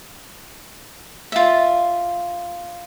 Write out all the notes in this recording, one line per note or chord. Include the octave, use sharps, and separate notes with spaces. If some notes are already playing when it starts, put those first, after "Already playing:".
F4 E5